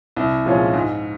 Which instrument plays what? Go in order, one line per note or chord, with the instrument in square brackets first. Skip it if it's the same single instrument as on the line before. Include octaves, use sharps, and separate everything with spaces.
[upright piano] C2
A#2 F3 G#3 C#4
G#2